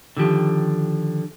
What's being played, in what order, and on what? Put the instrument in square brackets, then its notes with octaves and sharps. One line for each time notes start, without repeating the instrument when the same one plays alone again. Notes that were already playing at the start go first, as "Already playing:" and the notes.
[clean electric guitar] D3 D#3 F3 G4